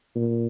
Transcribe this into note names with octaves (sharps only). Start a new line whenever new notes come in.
A#2